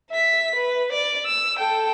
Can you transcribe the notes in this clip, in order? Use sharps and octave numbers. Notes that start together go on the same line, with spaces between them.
E5 B6
B4
D5
E6
A4 G5